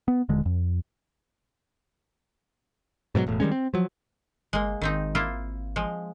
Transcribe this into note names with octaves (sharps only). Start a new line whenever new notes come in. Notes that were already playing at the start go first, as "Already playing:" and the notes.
B3
D#1 D3 G#3
F2
G#2 B2 F3 F#3
E1 A2
D#3 G3 G#3 C#4
C4
F3 F#3
G1 G#3 A#3
G#1 D#3 C4 D#4
A#3 E4 F4
F3 G#3